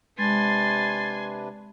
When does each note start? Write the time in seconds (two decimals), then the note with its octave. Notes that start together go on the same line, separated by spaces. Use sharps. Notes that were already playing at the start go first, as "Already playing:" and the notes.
0.19 C3 G#3 D4 B4 G#5 C6 A6